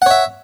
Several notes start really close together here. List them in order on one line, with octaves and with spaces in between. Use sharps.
F#5 C#5 E5